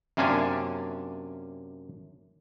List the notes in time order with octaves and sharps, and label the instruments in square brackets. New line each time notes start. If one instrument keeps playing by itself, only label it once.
[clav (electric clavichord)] F#2 C3 A#3 C#4 D4 G#5